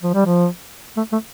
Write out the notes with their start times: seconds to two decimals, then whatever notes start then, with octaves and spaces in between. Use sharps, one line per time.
0.03 F3
0.14 G3
0.26 F3
0.97 A3
1.12 A3